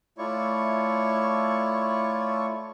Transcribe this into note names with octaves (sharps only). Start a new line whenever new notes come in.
A3 E4 F4 C#5 D5 C#6